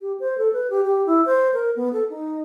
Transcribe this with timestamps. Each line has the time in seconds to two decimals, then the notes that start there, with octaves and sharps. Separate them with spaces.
0.01 G4
0.20 C5
0.38 A4
0.53 B4
0.70 G4
0.85 G4
1.06 E4
1.26 C5
1.54 A#4
1.76 B3
1.93 A4
2.10 D#4